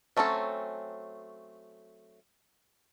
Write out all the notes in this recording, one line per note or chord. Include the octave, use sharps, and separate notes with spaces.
F#3 A3 C4 C#4 A4